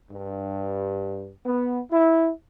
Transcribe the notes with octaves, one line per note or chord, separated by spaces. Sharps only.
G2
B3
E4